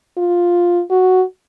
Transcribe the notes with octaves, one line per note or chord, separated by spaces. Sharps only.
F4
F#4